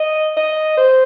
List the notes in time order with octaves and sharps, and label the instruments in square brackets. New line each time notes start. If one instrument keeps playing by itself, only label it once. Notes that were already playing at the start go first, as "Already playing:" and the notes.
Already playing: [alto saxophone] D#5
D#5
C5